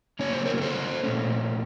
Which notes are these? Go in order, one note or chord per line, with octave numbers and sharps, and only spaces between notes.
C#3 F#3 A#3 C#4 C#5
C5
A#4 C#5
A#4
A4 C5
A#2 A3 C#4